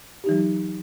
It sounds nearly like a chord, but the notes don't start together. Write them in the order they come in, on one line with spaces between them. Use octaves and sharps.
G4 D#4 E3 F#3